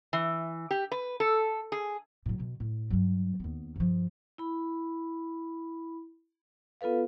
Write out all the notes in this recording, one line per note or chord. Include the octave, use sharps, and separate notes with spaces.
E3
G4
B4
A4
G#4
A2 F#3
B2
A2
G2 F#3
D#2 B3
G2 F3
E4 B5
B3 F4 A4 B4 F5